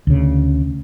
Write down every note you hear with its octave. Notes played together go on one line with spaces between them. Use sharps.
D2 C#3